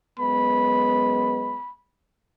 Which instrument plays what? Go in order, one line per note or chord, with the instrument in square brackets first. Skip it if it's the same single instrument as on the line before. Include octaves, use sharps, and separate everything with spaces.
[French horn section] F#2 G#3 B3 [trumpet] B5